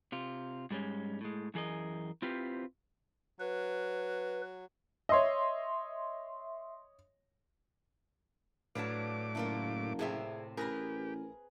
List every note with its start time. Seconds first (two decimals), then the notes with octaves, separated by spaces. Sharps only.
0.12 C3 F4
0.71 G#2 G3 G#3 C#4
1.21 A2 G#3
1.54 F#2 E3 G#4 A#4 D#5
2.22 C4 E4 F4 G4 B4 C5
3.40 F#3 B4
5.09 C#5 D#5 E5 C6
8.75 A2 F#3 D4 B4 F5 A5 D6
9.35 F#1 A3 A#3 F4
9.99 A2 C3 C4 G#4 E5
10.57 A1 G4 G#4 A#4 B4 A#5